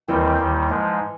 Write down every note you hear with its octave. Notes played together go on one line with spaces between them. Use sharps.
D#2 D#3 E3 G3 C4
D#2 D#3 G3
G#2 F3 G#3